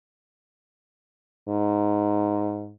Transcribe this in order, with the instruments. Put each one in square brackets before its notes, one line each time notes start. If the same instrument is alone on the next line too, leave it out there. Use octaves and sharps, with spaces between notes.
[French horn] G#2